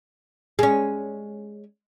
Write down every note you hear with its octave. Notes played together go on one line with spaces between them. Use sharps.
G#3 C#4